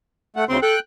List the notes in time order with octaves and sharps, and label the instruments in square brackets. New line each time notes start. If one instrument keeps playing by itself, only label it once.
[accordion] A3 F#5
[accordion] D2 C#3 C6 [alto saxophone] C4
[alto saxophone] A4 [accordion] G5 F#6